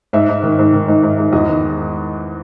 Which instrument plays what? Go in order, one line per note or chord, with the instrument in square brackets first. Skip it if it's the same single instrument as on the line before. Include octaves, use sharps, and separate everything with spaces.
[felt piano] G#2 E5
G#2
D#3
G#2
D#3
G#2
G#2
G#2
E2 D#5
D#3